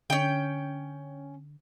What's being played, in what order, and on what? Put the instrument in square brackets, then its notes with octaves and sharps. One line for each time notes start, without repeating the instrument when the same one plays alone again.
[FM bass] D3 [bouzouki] C#4 G5